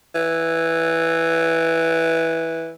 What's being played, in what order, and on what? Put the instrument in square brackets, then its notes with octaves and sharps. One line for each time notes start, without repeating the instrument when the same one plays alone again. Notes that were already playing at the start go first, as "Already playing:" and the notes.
[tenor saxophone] E3